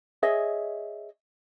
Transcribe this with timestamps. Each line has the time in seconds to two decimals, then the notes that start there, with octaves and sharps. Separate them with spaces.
0.23 G#4 C#5 D#5 E5